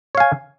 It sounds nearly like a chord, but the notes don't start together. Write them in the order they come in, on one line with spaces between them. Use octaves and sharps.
C#5 F5 G#5